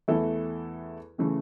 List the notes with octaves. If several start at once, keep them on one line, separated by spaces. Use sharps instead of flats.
E2 E3 A3 E4 A4
C#3 E3 A3 C#4